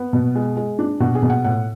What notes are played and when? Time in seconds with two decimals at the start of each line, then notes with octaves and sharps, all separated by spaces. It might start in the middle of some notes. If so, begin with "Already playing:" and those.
Already playing: B3
0.13 B2
0.35 G#3
0.56 G#3
0.79 D4
1.00 B2 F#4
1.15 G#4
1.22 B2
1.30 F#5
1.44 A2 F#5